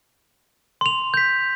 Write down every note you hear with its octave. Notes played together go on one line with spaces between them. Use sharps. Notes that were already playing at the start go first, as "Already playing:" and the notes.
C6 F7
G6 B6